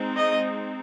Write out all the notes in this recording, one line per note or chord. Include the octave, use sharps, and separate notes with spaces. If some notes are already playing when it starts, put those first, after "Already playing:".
Already playing: G#3 C4 D#4
D#5